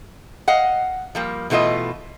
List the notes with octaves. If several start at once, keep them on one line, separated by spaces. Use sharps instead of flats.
D#5 F5 F#5
F3 G3 A#3
B2 E3 A3 F4 D#5